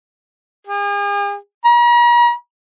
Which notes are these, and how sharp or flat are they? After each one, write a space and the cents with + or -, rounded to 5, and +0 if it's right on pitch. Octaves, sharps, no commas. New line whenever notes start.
G#4 -45
A#5 +45